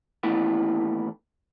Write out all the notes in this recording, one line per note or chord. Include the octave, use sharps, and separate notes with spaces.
D#2 A2 E3 B3